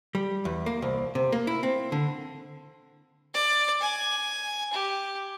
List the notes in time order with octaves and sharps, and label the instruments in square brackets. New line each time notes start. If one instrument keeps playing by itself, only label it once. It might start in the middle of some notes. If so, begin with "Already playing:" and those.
[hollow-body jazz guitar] G3
E2
A#3
C2
C3
A#3
E4
C4
D3
[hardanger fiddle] D5
G#5
G4